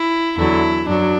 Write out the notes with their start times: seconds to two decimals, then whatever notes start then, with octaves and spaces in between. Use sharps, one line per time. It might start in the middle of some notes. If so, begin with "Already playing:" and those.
Already playing: E4
0.36 E2 D3 F#3 E4
0.87 F#2 F#3 D4